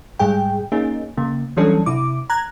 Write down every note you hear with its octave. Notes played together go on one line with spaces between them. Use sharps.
G#2 G3 G#4 G5
A#3 C#4 D#4 G#4
C#3 A#3
E3 F#3 G3 C#4 D4 A4
C3 E4 D6
A#5 F#6 G#6